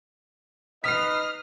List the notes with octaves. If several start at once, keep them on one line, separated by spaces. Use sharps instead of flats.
D#4 B4 D#5 D#6 F6 B6 C7